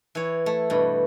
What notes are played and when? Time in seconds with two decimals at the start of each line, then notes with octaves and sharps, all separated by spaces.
0.15 E3 C#5
0.46 A3
0.70 G2 B2